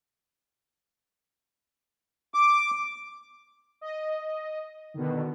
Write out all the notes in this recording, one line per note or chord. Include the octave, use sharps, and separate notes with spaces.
D6
D#5
B2 D3 D#3